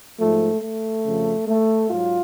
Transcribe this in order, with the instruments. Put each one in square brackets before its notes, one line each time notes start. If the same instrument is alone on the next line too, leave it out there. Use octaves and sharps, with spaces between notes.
[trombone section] G#2 F3 A3
A3
F2 C#3 F3
A3
G#2 F#3 F4